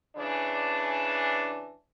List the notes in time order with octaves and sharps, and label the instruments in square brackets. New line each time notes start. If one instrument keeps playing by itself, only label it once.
[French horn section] C#3 E3 D4